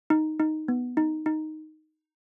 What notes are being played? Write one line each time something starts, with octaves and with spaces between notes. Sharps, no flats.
D#4
D#4
B3
D#4
D#4